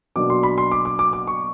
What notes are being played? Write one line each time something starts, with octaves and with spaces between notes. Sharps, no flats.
B2 F#3 A#3 D4 D6
C6
B5
C6
D6
D6
D6
D6
C#6